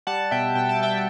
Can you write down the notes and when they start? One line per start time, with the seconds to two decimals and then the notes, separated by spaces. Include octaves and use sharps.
0.07 G3 F#5 A5
0.31 B2 E5 G5
0.55 B2 G5
0.69 A5
0.80 G3 E5 G5